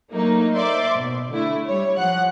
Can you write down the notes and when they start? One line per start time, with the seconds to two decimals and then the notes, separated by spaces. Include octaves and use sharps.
0.12 F#3 A3 A#3 D#4
0.54 C5 D5 E5 C6 D6
0.96 B2
1.31 D3 A3 E4
1.67 G3 C#5
1.97 F3 F#5 F#6